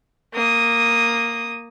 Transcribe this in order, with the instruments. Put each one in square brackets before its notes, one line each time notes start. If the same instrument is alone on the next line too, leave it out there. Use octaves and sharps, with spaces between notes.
[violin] A#3 D#6